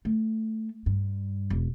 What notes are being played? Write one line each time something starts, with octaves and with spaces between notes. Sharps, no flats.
A3
G2
E1